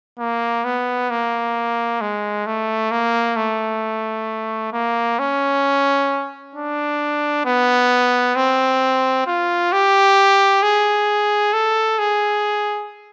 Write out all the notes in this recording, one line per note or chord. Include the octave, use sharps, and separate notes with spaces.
A#3
B3
A#3
G#3
A3
A#3
A3
A#3
C#4
D4
B3
C4
F4
G4
G#4
A4
G#4